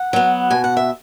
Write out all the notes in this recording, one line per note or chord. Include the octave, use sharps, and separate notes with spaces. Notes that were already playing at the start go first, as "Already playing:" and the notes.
Already playing: F#5
F#3 B3
B2 G#5
F#5
E5